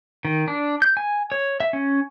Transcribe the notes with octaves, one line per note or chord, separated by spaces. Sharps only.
D#3
D4
G6
G#5
C#5
E5
C#4